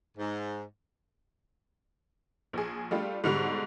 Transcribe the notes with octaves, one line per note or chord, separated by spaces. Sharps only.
G#2
A#1 G#4
G3 A3 D4 F4 G4
G#2 B2 D3 G3 C#6